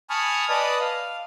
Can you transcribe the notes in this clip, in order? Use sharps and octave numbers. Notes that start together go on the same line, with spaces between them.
G#5 A5 B5 C#6 D#6 F6
B4 D5 D#5 A5 B5 D#6
F5